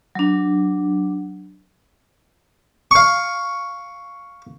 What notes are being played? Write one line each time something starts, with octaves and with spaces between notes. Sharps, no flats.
F#3 D4
F5 C#6